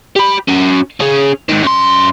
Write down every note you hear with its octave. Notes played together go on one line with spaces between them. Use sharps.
G4 B5
C#4 F#4
C#4 G#4
G#2 D#3
F#2 C6